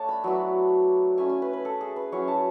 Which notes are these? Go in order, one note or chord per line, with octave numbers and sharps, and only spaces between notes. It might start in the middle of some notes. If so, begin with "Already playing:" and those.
Already playing: A3 D4 C#5 A5
B5
F#3 B3 E4
A3 C#4 E4 G#5
G#5
B4
B4
A4
G#4
B4
F#3 C#4 E4 C#5
A5